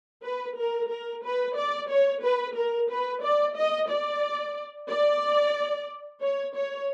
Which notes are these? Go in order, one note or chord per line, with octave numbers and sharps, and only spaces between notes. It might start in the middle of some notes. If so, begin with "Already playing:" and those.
B4
A#4
A#4
B4
D5
C#5
B4
A#4
B4
D5
D#5
D5
D5
C#5
C#5